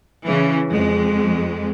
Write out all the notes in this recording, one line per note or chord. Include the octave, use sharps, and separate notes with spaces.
C#3 E3
F2 G#3